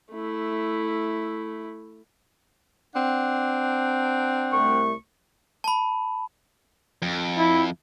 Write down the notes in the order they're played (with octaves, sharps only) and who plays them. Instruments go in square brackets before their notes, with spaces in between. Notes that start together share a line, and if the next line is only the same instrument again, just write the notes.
[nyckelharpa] A3 E4
[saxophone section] C4 D4 F#5
[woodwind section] C2 A3 C#6
[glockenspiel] A5 B5
[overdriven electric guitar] F2
[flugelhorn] E4